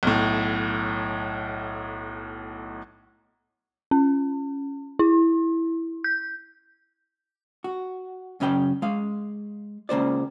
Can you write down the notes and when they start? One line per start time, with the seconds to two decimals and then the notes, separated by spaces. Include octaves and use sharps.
0.03 B1 A2
3.91 C#4
4.99 E4
6.04 G6
7.64 F#4
8.40 F#2 C#3 C#4 C5 G5
8.82 G#3 F5
9.89 C#2 C#3 A#3 C5 D5